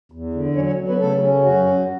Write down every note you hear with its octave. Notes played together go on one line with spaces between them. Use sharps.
E2
D3
F#3 C#4 C#5
C#4 C#5
F#3
B3 B4
C#3 A3 A4
C#4
F#2 F#3 F#4
F#2